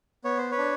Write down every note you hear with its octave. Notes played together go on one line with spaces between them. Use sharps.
B3 C#5
C5
B4 C#5
D4